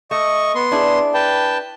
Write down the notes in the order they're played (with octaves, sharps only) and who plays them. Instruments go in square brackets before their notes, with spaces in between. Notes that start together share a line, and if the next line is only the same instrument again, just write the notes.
[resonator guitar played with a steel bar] A3 [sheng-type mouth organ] D#5 C#6
[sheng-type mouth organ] B3 C6
[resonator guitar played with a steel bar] D4 E4 G#4
[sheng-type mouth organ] B4 G5 A5